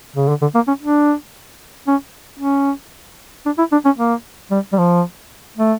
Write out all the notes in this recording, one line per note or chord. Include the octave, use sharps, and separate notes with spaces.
C#3
D3
D3
A#3
C#4
D4
C#4
C#4
D4
E4
D4
C#4
A#3
G3
G3
F3
A3